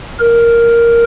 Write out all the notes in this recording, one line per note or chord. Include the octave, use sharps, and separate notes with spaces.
A#4